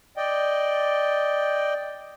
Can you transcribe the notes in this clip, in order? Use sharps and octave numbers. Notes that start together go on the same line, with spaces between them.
D5 D#5 G5